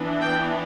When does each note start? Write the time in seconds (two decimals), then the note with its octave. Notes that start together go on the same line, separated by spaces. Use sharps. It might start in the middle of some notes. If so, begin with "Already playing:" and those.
Already playing: E3 B3 D4
0.21 G5